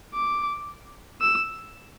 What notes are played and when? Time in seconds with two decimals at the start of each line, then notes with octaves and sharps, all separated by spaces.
0.14 D6
1.21 E6